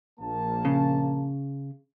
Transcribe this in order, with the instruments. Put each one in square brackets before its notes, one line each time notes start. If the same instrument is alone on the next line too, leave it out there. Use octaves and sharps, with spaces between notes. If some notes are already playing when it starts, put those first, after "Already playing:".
[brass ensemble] A#1 A#3 A5
[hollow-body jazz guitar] C#3